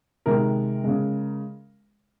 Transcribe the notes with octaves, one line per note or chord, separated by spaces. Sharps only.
C3 D#3 G#3 A#4
C#3 G#3